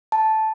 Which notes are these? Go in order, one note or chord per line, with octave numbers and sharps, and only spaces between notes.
A5